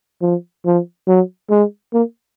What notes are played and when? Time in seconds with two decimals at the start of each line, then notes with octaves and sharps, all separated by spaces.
0.22 F3
0.66 F3
1.08 F#3
1.50 G#3
1.94 A#3